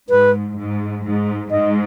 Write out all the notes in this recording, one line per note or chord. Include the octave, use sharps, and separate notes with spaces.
G#2 B4
G#2
G#2
G#2 D#5